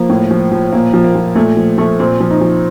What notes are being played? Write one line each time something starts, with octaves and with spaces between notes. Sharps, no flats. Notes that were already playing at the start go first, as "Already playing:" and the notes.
Already playing: F3 A#3
A2
F3
F3
A#2 A#3
F3
A#3
F3
A#2 A3
F3
F3 A3
A#2 C4
F3
D#4
F3